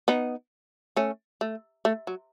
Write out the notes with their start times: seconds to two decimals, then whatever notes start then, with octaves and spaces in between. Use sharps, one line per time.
0.08 B3 D#4
0.96 A3 C#4
1.41 A3
1.85 A3
2.07 F#3